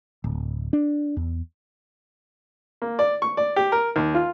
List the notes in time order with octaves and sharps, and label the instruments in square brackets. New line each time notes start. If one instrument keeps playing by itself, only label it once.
[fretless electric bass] D1
D4
E2
[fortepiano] A#3
D5
C#6
D5
G4
A#4
D#2
F4